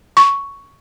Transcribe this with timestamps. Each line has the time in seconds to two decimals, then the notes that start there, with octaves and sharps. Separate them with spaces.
0.17 C#6